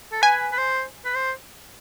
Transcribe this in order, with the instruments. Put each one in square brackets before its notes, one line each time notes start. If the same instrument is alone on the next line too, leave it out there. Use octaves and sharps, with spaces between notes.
[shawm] A4
[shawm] B4 [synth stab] G#5
[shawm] B4
C5
B4
C5